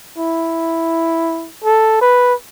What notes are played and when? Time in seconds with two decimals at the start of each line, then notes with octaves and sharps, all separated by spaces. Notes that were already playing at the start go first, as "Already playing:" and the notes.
0.18 E4
1.64 A4
2.01 B4